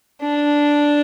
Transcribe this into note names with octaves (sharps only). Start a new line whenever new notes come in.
D4